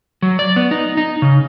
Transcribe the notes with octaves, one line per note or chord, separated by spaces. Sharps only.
F#3
D5
B3
D#4
D#4
C#3